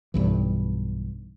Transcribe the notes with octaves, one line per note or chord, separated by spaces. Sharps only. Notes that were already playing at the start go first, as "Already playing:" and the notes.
B1 G2 E3